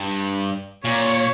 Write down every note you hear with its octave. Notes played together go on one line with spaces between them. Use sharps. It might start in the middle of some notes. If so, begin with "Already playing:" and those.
Already playing: G2
A#2 C#5